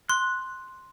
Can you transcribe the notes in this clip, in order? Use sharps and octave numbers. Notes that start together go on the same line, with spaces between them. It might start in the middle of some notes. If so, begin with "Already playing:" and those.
C6 F#6